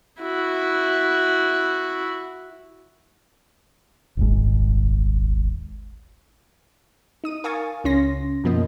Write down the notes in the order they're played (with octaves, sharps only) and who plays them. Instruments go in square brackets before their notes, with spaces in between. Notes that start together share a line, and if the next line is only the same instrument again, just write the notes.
[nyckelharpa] E4 F#4
[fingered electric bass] D#1 G#1 G#2
[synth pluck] D#4 D#6 D#7
A#4 F5 G#5 C#6 D#6 A6
C#2 C#3 C#4 C6 A#6
F#2 B2 F3 A#3 D#5